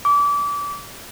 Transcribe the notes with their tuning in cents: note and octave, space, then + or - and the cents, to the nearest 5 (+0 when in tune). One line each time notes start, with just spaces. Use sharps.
D6 -30